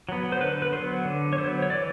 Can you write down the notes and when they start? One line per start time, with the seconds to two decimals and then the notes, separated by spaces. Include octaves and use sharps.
0.09 F#3 B3
0.32 C5
0.41 D3 B4
0.62 B4
0.73 F#3 B3 C5
1.05 D3
1.33 C#5
1.38 F#3 B3 C5
1.62 C#5
1.70 E3 D5